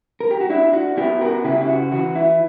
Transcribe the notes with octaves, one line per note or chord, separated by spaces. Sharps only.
A#4
G4
F#4
D4 E4
F#4
B3 E4 G4
F#4 A#4
C#3 E4 G4
E4
F#4
E3 F#4
E4